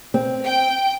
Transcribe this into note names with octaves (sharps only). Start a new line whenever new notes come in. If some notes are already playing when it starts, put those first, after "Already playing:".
C4
G5